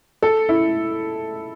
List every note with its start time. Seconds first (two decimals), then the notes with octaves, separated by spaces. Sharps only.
0.23 A4
0.49 E4